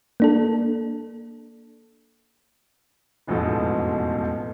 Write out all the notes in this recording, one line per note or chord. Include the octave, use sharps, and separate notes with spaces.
A#3 D4 A4
E1 A1 F2 G#2 B2 A4